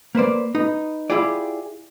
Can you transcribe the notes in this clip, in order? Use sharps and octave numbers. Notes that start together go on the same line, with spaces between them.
A#3 B4 C5 D5
D#4 B4
E4 F4 G4 G#4 D5